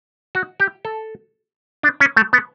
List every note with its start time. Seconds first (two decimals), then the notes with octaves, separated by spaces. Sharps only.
0.35 F#4
0.60 G4
0.85 A4
1.83 D4
2.00 C#4
2.17 A3
2.33 B3